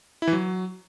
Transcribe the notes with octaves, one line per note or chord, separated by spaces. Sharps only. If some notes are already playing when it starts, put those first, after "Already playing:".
E4
E3
F#3